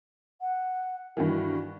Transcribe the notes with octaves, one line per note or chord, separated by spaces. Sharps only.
F#5
G2 D#3 E3 F#4